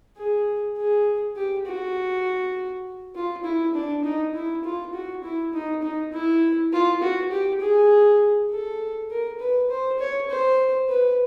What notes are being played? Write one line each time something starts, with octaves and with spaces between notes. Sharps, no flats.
G#4
G#4
G4
F#4
F4
E4
D4
D#4
E4
F4
F#4
E4
D#4
D#4
E4
F4
F#4
G4
G#4
A4
A#4
B4
C5
C#5
C5
B4